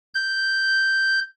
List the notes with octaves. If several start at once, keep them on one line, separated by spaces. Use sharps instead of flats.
G6